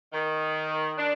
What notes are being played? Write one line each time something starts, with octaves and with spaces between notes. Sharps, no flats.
D#3
D4